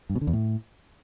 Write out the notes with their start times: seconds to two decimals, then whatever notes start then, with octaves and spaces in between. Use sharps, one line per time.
0.10 G2
0.15 B2
0.21 D3
0.27 E2
0.33 A2